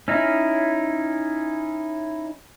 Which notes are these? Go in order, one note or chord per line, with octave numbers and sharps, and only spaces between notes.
C#4 D#4 E4